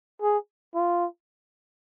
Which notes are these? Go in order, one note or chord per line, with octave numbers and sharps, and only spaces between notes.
G#4
F4